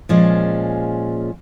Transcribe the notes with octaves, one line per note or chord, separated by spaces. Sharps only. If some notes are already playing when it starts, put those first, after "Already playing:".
A#2 F3 G#3 C#4